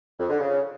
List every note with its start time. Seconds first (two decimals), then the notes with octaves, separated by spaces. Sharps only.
0.19 F2
0.30 D3
0.40 C#3